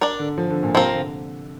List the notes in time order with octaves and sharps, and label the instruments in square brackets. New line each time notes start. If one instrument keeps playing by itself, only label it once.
[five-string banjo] D4 A#4 D5
[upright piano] D3
F3
D3
A#2
[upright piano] C3 [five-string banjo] F3 C4 F4 A#4
[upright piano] D3